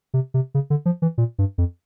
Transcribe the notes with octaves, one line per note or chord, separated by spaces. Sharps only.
C3
C3
C#3
D3
F3
E3
A#2
G2
F2